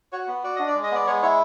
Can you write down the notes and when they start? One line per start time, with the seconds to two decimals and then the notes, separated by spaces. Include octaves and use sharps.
0.12 F#4 C#5
0.28 B3
0.44 F#4 D5
0.56 D4 D#5
0.67 D5
0.75 G#3
0.83 D#5
0.91 B3 D5
1.06 G#3 C#5
1.22 E4 C#5